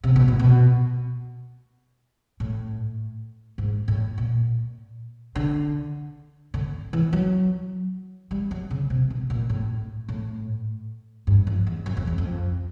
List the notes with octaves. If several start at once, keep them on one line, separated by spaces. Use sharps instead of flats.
C3
B2
A#2
B2
A2
G#2
A2
A#2
D3
D3
E3
F#3
G3
F#3
C#3
C3
B2
A#2
A2
A2
G2
F2
E2
F#2
F2
E2
F2